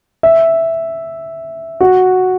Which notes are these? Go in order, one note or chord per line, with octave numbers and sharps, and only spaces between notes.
E5
F#4